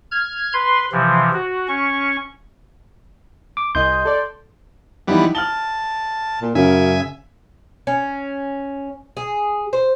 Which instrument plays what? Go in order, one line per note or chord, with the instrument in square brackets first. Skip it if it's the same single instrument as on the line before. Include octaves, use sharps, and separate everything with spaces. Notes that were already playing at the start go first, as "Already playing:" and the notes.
[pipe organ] F6 G#6
B4 C6
C3 E3 F3
F#4
C#4 C#6
[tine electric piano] D6
[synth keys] C2 D#5 G#5 [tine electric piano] C6 G6
[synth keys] A4 D5
[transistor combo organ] E3 G3 B3 [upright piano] F3 D#4 E4
[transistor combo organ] A5 [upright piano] F6 F#7 G7
[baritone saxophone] A#2
[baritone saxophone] F#2 [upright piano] C#3 [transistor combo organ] E5 G#5
[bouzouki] C#4
G#4
C5